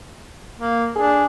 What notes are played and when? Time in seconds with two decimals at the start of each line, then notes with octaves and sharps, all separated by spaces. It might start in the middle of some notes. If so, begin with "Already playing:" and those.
0.58 A#3
0.96 D4 G#4